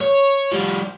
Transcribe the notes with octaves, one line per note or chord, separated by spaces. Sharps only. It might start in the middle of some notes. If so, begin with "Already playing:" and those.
C#5
F3 G3